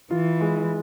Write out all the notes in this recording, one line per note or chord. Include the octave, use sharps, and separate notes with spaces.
E3 F4
G#3